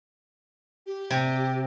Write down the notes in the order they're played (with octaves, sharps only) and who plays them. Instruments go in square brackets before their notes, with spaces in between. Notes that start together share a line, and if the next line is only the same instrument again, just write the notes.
[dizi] G4
[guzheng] C3